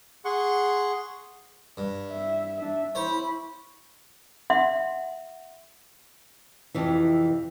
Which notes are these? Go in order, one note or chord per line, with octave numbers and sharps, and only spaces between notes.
G#4 F#5 C6 C#6
G2
E5
D4 E5
E4 C5 C#5 B5
E5 F#5 C6
F2 C3 E3